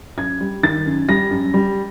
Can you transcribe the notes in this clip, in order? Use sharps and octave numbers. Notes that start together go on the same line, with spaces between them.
F#2 G#6
G3
D#3 A6
F#2
G3 A#6
F#2
G3